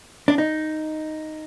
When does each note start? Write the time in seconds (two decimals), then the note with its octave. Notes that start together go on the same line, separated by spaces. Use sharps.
0.28 D4
0.38 D#4